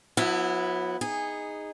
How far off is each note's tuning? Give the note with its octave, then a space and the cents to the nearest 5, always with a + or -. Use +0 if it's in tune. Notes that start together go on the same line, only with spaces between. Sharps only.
F#3 -35 B3 +0 E4 +0
D#4 +0 G#4 -15